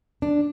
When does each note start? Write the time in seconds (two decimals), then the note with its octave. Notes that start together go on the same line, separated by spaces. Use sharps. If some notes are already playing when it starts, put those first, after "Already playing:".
0.22 D4